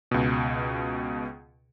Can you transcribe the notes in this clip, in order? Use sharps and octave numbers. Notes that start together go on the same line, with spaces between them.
C#2 B2